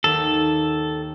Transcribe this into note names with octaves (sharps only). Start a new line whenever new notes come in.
D#2 A4